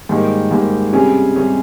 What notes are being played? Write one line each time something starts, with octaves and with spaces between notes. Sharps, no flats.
G#2 D#3 G3 A#3
G#2 D#3 G3 A#3
C3 G3 C#4 G#4
C3 G3 C#4 G#4